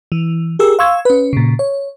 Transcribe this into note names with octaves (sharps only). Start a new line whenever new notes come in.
E3
G4 G#4 A#4 E6
F5 C6 C#6 E6 G#6
C#4 B4
A#2 C#3
C#5